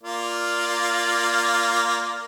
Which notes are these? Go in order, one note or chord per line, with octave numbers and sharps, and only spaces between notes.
A#3 F4 D5